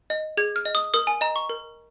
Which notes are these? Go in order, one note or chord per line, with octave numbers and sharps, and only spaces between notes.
D#5
G#4 G#6
F6
D#5
D#6
A#4 D#6
G#5
D#5 A#5
C#6
A#4